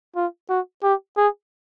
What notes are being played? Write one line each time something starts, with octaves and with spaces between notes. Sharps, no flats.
F4
F#4
G4
G#4